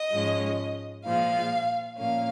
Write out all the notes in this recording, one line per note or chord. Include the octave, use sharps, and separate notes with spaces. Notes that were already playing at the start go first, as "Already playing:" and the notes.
Already playing: D#5
G#2 F3 G#3 C#4
A#2 F3 G#3 F5
A#2 F3 A#3 C#4 F5